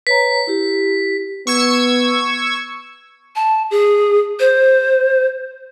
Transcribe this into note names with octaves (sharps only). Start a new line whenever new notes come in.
B4 C#5 A#5 B6
E4 G4
B3 C#6 E6 G#6
A5
G#4
C5